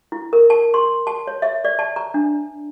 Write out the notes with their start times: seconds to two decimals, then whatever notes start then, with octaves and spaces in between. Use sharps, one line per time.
0.12 E4
0.33 A#4
0.50 A5
0.74 C6
1.07 A5
1.27 C#5
1.42 E5
1.65 D5
1.79 A5
1.96 A#5
2.14 D4